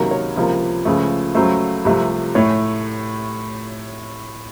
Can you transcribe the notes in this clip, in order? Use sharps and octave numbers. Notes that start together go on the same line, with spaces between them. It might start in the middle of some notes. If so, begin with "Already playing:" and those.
Already playing: C#2 C3 D#3 F#3 A#3 A#4
C#5
C#2 C3 F3 A#3
C#2 C#3 F3 A3
C#2 C#3 F#3 A3 C5
C2 C3 F3 A3
A2 A3 C#5